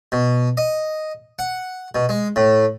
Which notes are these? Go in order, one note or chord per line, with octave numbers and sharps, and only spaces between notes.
B2
D#5
F#5
B2
G#3
A2